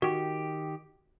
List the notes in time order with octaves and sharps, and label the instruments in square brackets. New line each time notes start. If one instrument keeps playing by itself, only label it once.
[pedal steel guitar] D#3 G4 [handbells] F#4